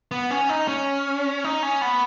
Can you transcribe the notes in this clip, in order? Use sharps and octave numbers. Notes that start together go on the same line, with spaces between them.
B3
C#4
D#4
C#4
D#4
C#4
B3